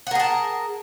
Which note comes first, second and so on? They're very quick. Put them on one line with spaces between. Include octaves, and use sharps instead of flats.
F#5 A#4 G#4 A5